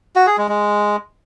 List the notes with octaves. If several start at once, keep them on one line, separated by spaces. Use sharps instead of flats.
F#4
G#4
G#3
G#3